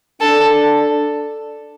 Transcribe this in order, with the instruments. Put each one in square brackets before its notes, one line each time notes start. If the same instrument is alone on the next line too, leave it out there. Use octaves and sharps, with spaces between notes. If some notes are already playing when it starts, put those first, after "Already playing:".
[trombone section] D4 [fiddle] A4